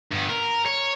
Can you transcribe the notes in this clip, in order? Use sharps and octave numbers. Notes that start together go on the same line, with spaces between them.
G2 B3
A#4
C#5